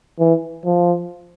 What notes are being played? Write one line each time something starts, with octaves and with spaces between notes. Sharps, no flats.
E3
F3